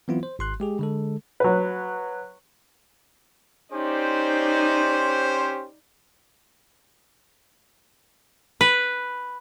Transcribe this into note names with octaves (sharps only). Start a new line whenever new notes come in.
E3 F#3 B3 C4 E4 F4
C5
G#1 C6 F#6
G#3 G4 G#4
D3 G#3 A4
F#3 B4
C#4 D#4 G4 C5 D5
B4